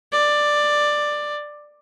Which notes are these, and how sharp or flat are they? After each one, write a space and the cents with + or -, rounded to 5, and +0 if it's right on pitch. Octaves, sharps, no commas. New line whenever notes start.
D5 +10